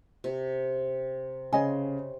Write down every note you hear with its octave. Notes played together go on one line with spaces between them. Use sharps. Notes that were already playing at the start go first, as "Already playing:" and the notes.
C3
C#3 C#5 D#5 G#5 C6